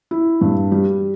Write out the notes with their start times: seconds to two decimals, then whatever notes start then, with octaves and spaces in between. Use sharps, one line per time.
0.11 E4
0.41 G2
0.72 G3